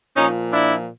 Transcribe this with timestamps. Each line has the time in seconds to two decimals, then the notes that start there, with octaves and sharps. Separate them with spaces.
0.17 A#2 F3 C#4 D#4
0.52 D4 E4